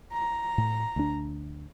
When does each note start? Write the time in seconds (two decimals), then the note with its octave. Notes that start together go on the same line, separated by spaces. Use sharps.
0.13 A#5
0.58 A2
0.96 D2 D4